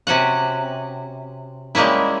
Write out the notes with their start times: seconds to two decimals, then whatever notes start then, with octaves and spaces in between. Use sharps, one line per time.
0.07 C3 C#4 F#4 F#5
1.75 G3 G#3 A#3 C#4 E4